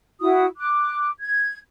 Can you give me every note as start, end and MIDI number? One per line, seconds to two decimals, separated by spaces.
0.20 0.45 64
0.20 0.45 66
0.20 0.45 87
0.57 1.10 86
0.57 1.10 90
1.19 1.58 92